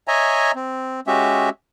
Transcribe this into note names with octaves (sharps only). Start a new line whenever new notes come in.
C#5 D#5 E5 G#5 A#5
C4
G#3 C#4 F#4 G4 E5